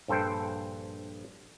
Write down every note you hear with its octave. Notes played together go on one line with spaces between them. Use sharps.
A#1 G2 A4 C5 G5